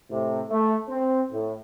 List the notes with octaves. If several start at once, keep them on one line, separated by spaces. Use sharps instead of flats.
A2 C3
A3
C4
A2